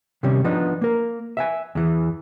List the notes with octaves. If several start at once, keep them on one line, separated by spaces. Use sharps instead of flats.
C3 D#3 G3 C#4
F3 B3 D4 D#4
A#3 A#4
E5 F5 G#5
E2 E3